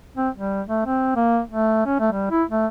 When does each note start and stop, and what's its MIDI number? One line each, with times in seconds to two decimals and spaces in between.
0.17 0.29 60
0.36 0.62 55
0.67 0.83 57
0.86 1.13 60
1.15 1.40 58
1.49 1.82 57
1.86 1.96 61
2.00 2.09 57
2.12 2.30 55
2.31 2.43 64
2.49 2.67 57